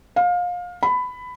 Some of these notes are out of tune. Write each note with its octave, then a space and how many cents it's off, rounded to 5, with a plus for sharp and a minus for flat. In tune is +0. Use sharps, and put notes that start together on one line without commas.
F5 +25
B5 +15